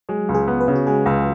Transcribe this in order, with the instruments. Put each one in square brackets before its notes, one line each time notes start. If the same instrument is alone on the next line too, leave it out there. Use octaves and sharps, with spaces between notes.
[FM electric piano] F#3 [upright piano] G#3
[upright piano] C#2
[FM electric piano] G#4
[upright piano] B3
[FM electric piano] B4
[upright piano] C#3
[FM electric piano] F#4
[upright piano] G#3 [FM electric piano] G#4
[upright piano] C#2 [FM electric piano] B4